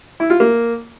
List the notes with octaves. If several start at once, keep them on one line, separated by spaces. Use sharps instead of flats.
E4
F4
A#3